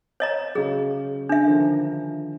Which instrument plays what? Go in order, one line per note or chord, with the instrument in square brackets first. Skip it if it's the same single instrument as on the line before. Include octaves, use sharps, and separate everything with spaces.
[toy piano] C#5 D#5 A#5
[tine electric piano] C#3 F#3 [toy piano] G#4
[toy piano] D4 E5
[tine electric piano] D3 D#3 F3